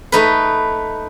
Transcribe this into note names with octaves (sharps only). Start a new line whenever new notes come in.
A3 D#4 B4